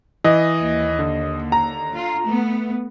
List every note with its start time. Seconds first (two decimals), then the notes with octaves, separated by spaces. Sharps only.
0.24 E3 D#5
0.59 D#2
0.99 D3
1.52 A#5
1.94 F4
2.24 A3 B3